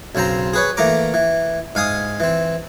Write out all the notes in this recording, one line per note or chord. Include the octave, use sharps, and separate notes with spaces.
B1 C#3 C4 C5 A#5
G#4 B4 C#5
E3 A3 A#3 A#5 D6
E3
G#2 F5 G#5 D#6
E3 C4